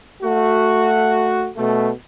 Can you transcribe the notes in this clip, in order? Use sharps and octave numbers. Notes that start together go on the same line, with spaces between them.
A3 F#4
B2 A3